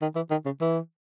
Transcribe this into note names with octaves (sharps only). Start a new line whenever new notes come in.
D#3
E3
D#3
C#3
E3